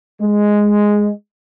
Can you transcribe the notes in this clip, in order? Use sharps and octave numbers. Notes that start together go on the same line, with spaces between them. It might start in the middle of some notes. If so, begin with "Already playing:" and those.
G#3